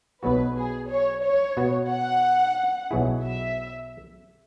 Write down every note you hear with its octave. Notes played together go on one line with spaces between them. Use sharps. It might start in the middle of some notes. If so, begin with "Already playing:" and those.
B1 B2 F#3 B3 F#4 B4
G#4
C#5
C#5
B2 B3 F#4
F#5
B1 B2 F#3 E4 G#4
E5